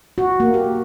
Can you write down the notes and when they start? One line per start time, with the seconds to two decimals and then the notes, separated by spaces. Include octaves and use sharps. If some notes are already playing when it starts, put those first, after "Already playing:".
0.18 F#4
0.40 A#3
0.54 G4